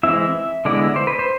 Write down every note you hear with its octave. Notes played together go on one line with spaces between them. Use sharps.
E3 G#3 C4 E4 E5
D3 G#3 B3 E4 D5
C5
B4
C5